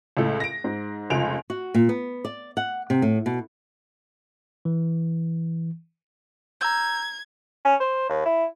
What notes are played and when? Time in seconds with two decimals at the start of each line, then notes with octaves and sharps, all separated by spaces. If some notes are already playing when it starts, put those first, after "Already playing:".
0.17 C#2 A2 A4
0.40 A#6 D7
0.64 G#2
1.10 F1 C#2 F4 D7 F7
1.50 F#4
1.74 A#2
1.89 B3
2.25 D5
2.57 F#5
2.90 C3
3.02 A2
3.26 B2
4.65 E3
6.61 A#5 E6 G6 G#6
7.65 C#4
7.80 C5
8.09 D#2
8.25 E4